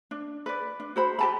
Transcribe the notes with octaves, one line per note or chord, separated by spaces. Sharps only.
D4
B4 D5
D4
F#4 C5 B5
G4 A5 B5